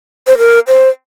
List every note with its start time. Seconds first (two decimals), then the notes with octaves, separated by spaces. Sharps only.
0.27 C5
0.38 A#4
0.68 C5